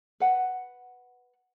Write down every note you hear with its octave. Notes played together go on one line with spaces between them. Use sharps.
B4 F#5